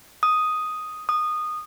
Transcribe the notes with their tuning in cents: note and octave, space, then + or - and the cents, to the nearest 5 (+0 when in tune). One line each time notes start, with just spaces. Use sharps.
D#6 +0
D#6 -20